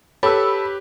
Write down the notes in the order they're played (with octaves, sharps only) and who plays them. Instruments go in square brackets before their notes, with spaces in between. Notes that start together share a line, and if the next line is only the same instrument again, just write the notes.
[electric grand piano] G4 B4 [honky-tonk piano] A4 [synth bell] C#5 [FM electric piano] B5 E6